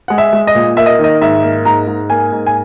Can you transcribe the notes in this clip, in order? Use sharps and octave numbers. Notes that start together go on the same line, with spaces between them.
G#3 F#5
E5
G#3
D#5
A#2
A#3 E5
D#5
D#3 D#5
G#2 E5
A#3
G#2 A#5
G#2
A#3 G#5
G#2
G#5